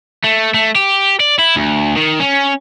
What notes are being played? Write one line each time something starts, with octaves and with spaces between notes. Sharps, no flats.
A3
A3
G4
D5
E4
D2
D#3
C#4